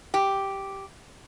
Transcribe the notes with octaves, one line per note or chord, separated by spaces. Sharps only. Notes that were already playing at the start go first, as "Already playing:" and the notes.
G4